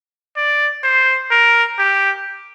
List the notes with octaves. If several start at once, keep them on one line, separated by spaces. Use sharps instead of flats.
D5
C5
A#4
G4